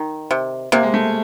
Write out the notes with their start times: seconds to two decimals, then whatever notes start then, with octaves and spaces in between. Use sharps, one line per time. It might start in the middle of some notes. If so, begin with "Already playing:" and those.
Already playing: D#3
0.31 C3
0.72 C3 A#3
0.83 G#3
0.94 A3